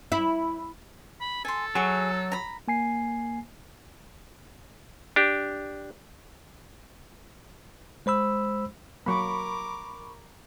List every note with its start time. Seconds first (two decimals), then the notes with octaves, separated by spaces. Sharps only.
0.12 E4
1.21 B5
1.45 A4 G#5 C6
1.75 F#3 G#4 C#6
2.32 A#5 B5
2.68 A#3 G#5 C7
5.16 D4 G4
8.06 G#3 C5 B5 E6
9.06 F#3 A#3 A#4 B5 C#6 D6